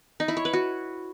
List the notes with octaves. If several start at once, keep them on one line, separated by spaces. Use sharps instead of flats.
D#4
E4
C#5
B4
F#4